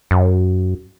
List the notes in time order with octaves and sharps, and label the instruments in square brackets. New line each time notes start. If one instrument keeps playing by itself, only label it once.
[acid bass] F#2